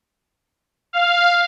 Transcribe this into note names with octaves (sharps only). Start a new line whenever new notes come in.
F5